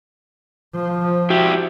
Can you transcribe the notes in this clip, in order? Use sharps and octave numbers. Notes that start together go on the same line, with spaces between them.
F3
E4 F#4 G4